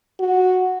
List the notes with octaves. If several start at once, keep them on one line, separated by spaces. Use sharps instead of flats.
F#4